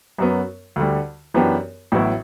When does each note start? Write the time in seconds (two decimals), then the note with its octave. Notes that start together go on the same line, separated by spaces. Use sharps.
0.18 F#2 F#3 B3
0.76 D2 D3 G3
1.34 F#2 E3 B3 D4 G4
1.92 A1 A2 F#3 B3 E4